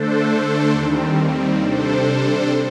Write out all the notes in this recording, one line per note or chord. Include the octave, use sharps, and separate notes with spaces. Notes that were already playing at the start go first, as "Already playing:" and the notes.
Already playing: D3 A3 D4 A4 C5
D#2 D#3 G3 C4
C3 G3 D4 A4 C5